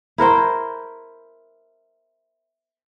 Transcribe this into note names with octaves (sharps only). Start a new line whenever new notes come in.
E4 A#4 C5 G5